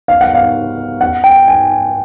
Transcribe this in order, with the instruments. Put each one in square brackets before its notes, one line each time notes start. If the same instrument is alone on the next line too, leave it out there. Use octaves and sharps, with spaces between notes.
[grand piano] F5
F#5
F5
F#5
G5
G#5